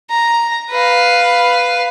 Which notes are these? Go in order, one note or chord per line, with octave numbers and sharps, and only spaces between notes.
A#5
B4 F5